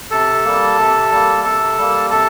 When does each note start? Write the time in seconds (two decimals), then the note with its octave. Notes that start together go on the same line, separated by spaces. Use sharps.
0.11 C3 A4 A5
0.45 G3 A#3
0.78 C3
1.12 G3 A#3
1.44 C3 A4 A5
1.78 G3 A#3
2.10 C3 A4 A5